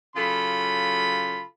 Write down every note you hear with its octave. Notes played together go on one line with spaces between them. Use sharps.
C#3 F#3 F4 A4 B5